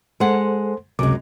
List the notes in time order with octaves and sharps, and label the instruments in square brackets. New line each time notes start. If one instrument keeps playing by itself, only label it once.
[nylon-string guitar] G#3 F#5 [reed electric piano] A4 C5 C6
[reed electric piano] C#2 C3 D6 [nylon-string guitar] F#2 G#3